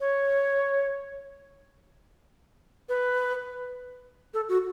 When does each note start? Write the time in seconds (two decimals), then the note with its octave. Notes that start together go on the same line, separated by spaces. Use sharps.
0.01 C#5
2.89 B4
4.34 A4
4.49 F#4